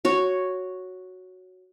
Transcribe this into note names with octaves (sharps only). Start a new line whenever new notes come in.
F#4 C#5